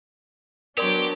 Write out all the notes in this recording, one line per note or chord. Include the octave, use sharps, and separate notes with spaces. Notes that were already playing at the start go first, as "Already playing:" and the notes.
F#3 B3 D4 G4 A#4 D5 C6